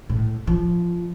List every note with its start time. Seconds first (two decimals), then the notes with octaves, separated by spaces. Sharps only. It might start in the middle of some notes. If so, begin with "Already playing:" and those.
0.09 A2
0.47 F3